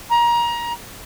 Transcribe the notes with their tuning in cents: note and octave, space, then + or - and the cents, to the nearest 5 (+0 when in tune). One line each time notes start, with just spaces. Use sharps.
A#5 +25